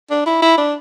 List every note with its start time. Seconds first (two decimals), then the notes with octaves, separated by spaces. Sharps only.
0.10 D4
0.26 E4
0.42 E4
0.58 D4